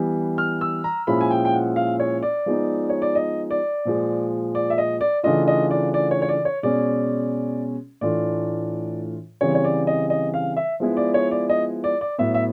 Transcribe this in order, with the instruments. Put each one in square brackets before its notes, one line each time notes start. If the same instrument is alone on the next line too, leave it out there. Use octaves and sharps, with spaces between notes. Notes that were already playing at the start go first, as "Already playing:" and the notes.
Already playing: [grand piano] E3 G3 B3
F6
E6
A#5
A#2 F3 G#3 C#4 E4 B5
G#5
G5
G5
F#5
F5
C#5
D5
F3 G#3 B3 D#4
C#5
D5
D#5
D5
A#2 F3 G#3
D5
E5
D#5
D5
C#3 E3 A3 D4 F4 D#5
D#5
D5
D5
C#5
C#5
D5
C#5
B2 G#3 C#4 D5
A2 E3 A3 D4 F4 D5
C#3 E3 G3 C4 C#5
C#5
D5
D#5
D#5
F5
E5
F3 G#3 B3 E4
D5
C#5
D5
D#5
D5
D5
A2 F#3 B3 E5
E5